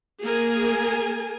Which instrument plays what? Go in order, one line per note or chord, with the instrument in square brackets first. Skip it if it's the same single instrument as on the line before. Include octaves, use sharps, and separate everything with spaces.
[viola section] A#3 G#4 A#4 G#5